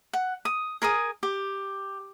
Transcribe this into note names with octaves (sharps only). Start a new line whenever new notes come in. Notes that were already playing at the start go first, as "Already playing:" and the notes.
F#5
D#6
G#4 A#4 G#5 D#6
G4